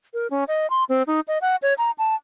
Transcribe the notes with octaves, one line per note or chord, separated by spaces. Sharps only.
A#4
C#4
D#5
C6
C4
D#4
D#5
F#5
C#5
A#5
A5